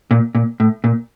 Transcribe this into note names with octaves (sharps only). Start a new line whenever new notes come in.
A#2
A#2
A2
A#2